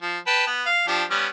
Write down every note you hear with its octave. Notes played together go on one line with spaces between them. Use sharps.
F3
B4 G5 A5
B3
F5
F3 D4 G4
G3 B3 C#4